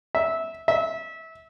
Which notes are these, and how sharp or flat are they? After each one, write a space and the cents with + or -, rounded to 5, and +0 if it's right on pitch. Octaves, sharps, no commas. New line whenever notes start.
E5 -15
E5 -25